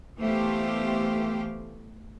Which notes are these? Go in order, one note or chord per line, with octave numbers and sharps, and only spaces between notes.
E3 A3 B3 G4 C5 F5